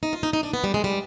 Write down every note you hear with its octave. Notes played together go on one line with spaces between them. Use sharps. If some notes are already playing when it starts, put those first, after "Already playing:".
D#4
F4
D#4
D#4
D4
B3
G3
G#3
G3